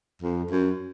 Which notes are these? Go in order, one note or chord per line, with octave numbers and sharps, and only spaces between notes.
F2
F#2